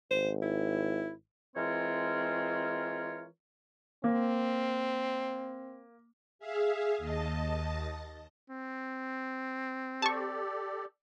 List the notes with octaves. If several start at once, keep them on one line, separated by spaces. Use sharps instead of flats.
G#1 C5
E4
E3 G#3 C4 F4 A#4 C#5
A#3 C4
G#4 E5 F5
D#2 D#5 A5
C4
G4 A4 D5 A5 C#6